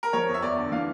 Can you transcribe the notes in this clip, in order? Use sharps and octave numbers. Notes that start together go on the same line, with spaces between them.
A#4
F3 C#5
E2
E5
E2 D5
D3
E3 F5